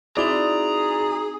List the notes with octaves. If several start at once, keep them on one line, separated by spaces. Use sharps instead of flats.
C4 D#4 E4 F#4 G#4 D5 A#5